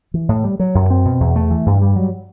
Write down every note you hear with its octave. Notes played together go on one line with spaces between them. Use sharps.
E3
A2
G3
F#3
F#2
C4
B2
E2
A3
E3
G2
G3
F#3